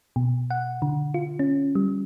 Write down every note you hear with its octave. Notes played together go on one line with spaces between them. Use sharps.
B2
F#5
D3
F4
C#4
G3